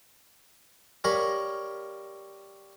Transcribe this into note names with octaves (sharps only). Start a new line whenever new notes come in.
G3 A#4 C#5 F5 B5